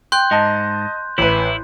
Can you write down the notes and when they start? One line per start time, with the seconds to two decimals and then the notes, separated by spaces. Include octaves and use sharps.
0.12 G5 C6 F#6 G6
0.31 G#2 D#5 A5
1.18 A1 E4 B4